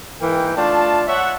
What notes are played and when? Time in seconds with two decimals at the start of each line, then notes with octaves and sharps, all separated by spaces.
0.22 G#2 E3 A#3 G5
0.57 A3 D4 F4 A5
1.07 C#5 E5 F#5